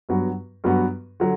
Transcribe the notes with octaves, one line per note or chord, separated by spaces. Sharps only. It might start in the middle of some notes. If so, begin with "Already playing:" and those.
G2 F#3 B3 F#4
G2 F#3 B3 F#4
D3 F#3